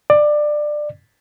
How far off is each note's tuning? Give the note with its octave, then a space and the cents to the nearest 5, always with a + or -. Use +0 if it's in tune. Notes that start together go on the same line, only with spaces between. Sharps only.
D5 +20